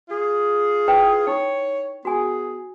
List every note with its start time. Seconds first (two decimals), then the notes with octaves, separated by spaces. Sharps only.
0.09 F4 G#4
0.88 E4 B4 G5
1.27 D#4 C#5
2.05 B3 F#4 G#4 G#5